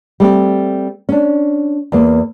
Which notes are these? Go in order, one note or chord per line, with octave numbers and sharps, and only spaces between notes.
G3 A3 C4
C#4 D4
E2 A#3